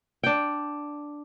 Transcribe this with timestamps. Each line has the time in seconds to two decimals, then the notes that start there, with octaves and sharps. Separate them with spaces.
0.23 D4 G5